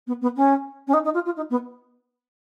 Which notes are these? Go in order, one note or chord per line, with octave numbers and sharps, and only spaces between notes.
B3
B3
C#4
C#4
D#4
D#4
F4
F4
D#4
B3